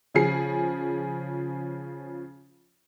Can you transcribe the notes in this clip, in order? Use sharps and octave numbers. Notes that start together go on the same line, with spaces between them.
C#3 F3 G#4 C7